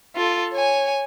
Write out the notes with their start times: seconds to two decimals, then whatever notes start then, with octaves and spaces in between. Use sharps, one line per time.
0.16 F4 A4
0.53 C#5 G#5